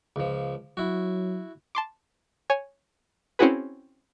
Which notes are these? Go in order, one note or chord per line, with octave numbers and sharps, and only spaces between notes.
C#2 F3
F#3 E4 F#4
A5 C6 D6
C#5 G#5
C4 C#4 E4 F#4 G#4 B4